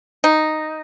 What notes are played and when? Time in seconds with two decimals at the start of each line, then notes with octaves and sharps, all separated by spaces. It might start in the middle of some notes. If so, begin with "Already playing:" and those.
0.24 D#4